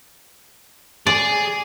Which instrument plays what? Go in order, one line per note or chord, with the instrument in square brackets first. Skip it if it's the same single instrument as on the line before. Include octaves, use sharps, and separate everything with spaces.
[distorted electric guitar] G#4 [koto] D5